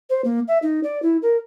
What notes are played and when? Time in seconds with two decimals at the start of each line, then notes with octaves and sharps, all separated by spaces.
0.10 C5
0.25 A#3
0.48 E5
0.62 D#4
0.83 D5
1.02 E4
1.22 A#4